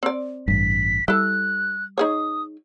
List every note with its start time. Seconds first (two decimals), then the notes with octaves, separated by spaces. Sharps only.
0.03 C4 D5
0.48 A1 G2 B6
1.08 G3 E4 A4 F#6
1.98 D#4 G#4 C#5 D#6